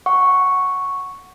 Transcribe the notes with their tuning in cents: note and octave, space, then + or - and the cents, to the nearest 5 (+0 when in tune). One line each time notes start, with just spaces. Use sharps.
F#5 +0 C#6 +0